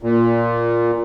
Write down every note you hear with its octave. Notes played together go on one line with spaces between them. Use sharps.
A#2